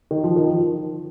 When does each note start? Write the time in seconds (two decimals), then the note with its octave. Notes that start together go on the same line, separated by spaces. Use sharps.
0.11 D#3
0.24 F3
0.36 D#3
0.47 F3